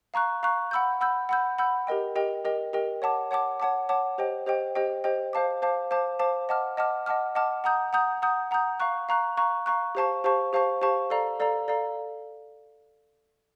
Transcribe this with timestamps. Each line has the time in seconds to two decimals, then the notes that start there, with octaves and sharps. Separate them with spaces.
0.14 F5 A#5 C#6 F#6
0.43 F5 A#5 C#6 F#6
0.71 F#5 B5 E6 G6
1.01 F#5 B5 E6 G6
1.29 F#5 B5 E6 G6
1.58 F#5 B5 E6 G6
1.87 G4 A#4 D#5 G5
2.16 G4 A#4 D#5 G5
2.45 G4 A#4 D#5 G5
2.73 G4 A#4 D#5 G5
3.02 C#5 F#5 A5 D6
3.31 C#5 F#5 A5 D6
3.60 C#5 F#5 A5 D6
3.89 C#5 F#5 A5 D6
4.18 G4 C5 D#5 G5
4.46 G4 C5 D#5 G5
4.75 G4 C5 D#5 G5
5.04 G4 C5 D#5 G5
5.33 C5 F5 A5 D6
5.62 C5 F5 A5 D6
5.91 C5 F5 A5 D6
6.19 C5 F5 A5 D6
6.49 D#5 F#5 A5 D6 F6
6.77 D#5 F#5 A5 D6 F6
7.06 D#5 F#5 A5 D6 F6
7.35 D#5 F#5 A5 D6 F6
7.64 F#5 A#5 D#6 G6
7.93 F#5 A#5 D#6 G6
8.22 F#5 A#5 D#6 G6
8.51 F#5 A#5 D#6 G6
8.80 F5 A#5 C#6 F#6
9.09 F5 A#5 C#6 F#6
9.37 F5 A#5 C#6 F#6
9.66 F5 A#5 C#6 F#6
9.95 G4 C5 F5 A5 C#6
10.24 G4 C5 F5 A5 C#6
10.53 G4 C5 F5 A5 C#6
10.81 G4 C5 F5 A5 C#6
11.10 A4 D5 F5 A#5
11.40 A4 D5 F5 A#5
11.68 A4 D5 F5 A#5